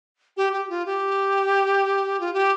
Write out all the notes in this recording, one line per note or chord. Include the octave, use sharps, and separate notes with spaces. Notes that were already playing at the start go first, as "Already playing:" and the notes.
G4
G4
F4
G4
F4
G4